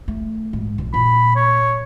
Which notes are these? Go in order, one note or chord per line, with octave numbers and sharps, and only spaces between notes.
A3
G#2
A#1 D3
A#2 B5
C#5